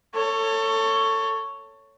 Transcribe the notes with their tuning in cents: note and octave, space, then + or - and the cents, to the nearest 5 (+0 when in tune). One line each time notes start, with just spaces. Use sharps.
A4 +25 C#5 +0